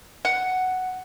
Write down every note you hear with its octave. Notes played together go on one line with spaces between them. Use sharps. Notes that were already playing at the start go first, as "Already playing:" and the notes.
F#5